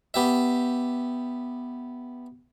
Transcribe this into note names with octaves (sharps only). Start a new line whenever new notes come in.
B3 G4 E5